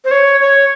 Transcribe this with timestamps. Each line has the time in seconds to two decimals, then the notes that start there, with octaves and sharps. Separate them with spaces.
0.05 C5
0.11 C#5
0.40 C#5